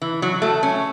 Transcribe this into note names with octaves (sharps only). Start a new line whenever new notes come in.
E3
F#3
A3
C#4